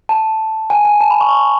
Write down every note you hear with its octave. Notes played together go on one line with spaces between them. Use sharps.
A5
G#5
G#5
A5
B5
C#6